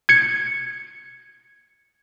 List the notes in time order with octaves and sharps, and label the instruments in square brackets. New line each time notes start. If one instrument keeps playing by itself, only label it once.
[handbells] G#6 C#7